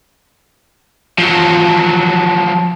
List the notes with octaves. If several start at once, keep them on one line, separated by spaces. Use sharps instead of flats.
F3 F#3